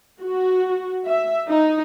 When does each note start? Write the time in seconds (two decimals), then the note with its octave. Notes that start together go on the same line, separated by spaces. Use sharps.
0.21 F#4
1.06 E5
1.47 D#4